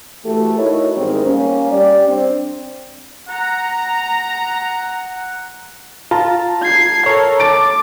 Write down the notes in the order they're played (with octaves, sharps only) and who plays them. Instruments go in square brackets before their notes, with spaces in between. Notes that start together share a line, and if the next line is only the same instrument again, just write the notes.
[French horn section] E3 A3 F#4 G4 A4
D#4 E4 F#4 A#4 C#5
E2 G#2 D#3 G3 C4
G3 A#3 C#4
G3 G4 D5
C4 D4
[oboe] F#5 [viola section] A#5
[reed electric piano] F4 [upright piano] A5 A#5
[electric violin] G#6 C7
[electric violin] A4 A#4 [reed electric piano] C#5
[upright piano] A5 A6 D7 [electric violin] D6